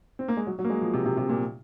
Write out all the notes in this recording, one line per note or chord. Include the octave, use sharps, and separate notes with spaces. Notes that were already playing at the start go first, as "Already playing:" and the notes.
C4
A#3
G#3
F#3
F#3
A#3
G#3
F3
C3
C3
C3
A#2